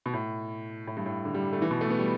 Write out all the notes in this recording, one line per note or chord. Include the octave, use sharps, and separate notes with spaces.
B2
A2
A2
G2
A2
D3
G3
A3
E3
B2
A3
B3
G3